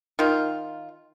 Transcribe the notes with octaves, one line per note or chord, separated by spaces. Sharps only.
D#3 F4